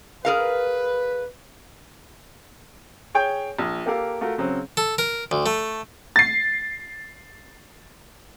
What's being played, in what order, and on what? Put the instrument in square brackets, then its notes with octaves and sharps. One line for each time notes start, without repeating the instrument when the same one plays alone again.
[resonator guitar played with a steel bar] G#4 A#4 F5 [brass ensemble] B4
[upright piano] G#4 C#5 G5 G6
A#1
A#3 G4 A4 A#4 F5
A3 F4 F#4 A#4
C#3 F#3 C4
[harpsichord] A4
A#4
D2
A3
[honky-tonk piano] A6 C7